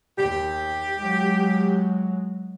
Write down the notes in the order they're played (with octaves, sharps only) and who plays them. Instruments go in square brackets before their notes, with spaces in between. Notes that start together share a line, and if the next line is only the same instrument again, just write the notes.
[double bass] D#2 [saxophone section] G4
[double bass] F#3 G#3